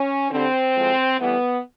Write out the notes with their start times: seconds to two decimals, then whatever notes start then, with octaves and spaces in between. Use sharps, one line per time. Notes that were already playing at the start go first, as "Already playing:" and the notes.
Already playing: C#4
0.31 D3 G3 C4
0.75 A2 F3 G#3
1.19 A2 E3 G3 B3